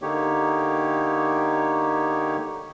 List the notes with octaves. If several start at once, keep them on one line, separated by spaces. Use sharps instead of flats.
D3 A#3 D#4 G4 C#5